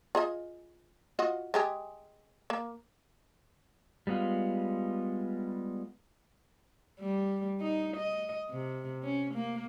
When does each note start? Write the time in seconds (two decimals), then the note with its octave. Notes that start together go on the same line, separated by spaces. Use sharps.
0.15 F4 G#4 D#5
1.19 F4 F#4 D#5
1.54 G#3 G4 G#4
2.50 A#3
4.07 G3 G#3 B3 F4
7.00 G3
7.61 D#4
7.96 D#5
8.50 C3
9.03 C#4
9.34 A#3